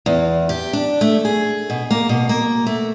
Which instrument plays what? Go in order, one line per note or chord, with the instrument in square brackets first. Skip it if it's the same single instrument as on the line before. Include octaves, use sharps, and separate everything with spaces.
[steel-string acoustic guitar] E2
G4
D4
A3
G#4
B2
A#3
B2
A#3
A3